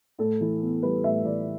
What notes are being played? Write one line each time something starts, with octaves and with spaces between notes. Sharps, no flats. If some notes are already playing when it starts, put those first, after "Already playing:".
A2 A4
E3
B3
G3 B4
A2 E5
E3 D5